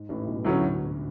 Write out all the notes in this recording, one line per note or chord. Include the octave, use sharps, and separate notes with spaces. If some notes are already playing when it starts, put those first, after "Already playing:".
Already playing: G#2
A1 A2
B1 B2
D2 A2 D3 F#3 C#4